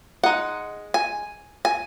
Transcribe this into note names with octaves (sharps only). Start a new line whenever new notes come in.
G#3 D#4 F#5
G#5
G#5